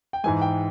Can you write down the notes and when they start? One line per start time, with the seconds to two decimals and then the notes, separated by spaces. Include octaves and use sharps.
0.13 G5
0.24 G#2 E3 G#3 G#5
0.42 G5